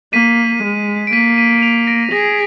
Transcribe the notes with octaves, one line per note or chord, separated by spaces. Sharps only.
A#3 B6 D#7
G#3
D7
A#3 B6 D#7
B6 D#7
D#7
D7 F7
A#6 D7
G#4 A#6